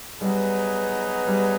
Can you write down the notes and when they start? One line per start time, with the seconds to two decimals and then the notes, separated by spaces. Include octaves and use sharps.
0.21 F#3 G3 B3 D#4 G#4 B4
1.27 G3